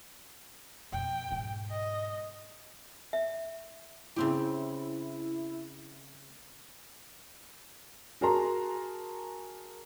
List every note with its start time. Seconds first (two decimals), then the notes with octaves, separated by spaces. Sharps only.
0.92 F2 B2 G5
1.31 G#2 B2
1.71 D#5
3.13 E5
4.16 C#3 C4 E4 G4
8.21 F#4 G#4 A#4 A5 A#5 C6